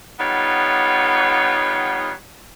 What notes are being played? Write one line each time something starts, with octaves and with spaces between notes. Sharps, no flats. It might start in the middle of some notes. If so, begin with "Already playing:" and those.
G3 B3 D#4 F4 C#5 F#5